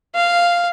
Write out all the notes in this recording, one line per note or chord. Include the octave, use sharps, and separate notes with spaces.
F5